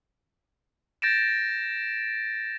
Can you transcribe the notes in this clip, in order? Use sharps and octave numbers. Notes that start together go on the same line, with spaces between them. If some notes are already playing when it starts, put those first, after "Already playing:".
G6 A6 A#6 D7 E7